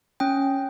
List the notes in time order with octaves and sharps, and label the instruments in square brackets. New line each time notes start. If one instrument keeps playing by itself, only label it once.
[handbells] C#4 G5